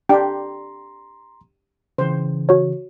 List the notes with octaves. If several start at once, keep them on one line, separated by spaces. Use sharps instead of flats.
D4 G4 G5 A#5 C6
C#3 E3 C5
F#4 C#5